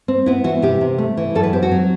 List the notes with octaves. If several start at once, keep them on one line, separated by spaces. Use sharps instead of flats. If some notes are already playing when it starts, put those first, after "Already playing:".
C4
B3 E4
E3 F#4
C3 G4
C3
A3
E3
F#2 A4
B4
C4 G4
F#4
F#3